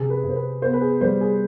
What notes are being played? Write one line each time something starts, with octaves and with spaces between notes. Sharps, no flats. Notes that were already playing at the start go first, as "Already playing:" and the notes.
Already playing: C3 G#4
B4
C3
C5
B4
B3 C5
B4
G#4
G3 C5
G#4